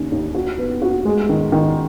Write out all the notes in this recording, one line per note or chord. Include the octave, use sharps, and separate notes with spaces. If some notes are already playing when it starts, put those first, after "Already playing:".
Already playing: D#2 C#4
D#2
F#4
B3
F#4
G#3
D#3
D#3